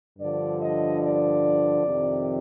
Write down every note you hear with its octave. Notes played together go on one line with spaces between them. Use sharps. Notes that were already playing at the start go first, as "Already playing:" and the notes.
G2 D3 F3 D5
D#5
D5
F2 C3 D#3